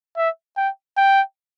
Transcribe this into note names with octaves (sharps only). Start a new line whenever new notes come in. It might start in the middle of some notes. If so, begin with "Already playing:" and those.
E5
G5
G5